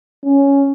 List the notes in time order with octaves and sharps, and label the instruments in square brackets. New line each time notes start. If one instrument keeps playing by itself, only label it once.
[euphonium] C#4